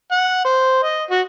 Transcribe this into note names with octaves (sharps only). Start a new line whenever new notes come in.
F#5
C5
D#5
F#4